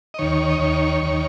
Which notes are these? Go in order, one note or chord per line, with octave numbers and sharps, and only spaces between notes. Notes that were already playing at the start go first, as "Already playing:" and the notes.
D#5
D#2 D#3 C#5
D#5
D#2 D#3 C#5
D#2 D#3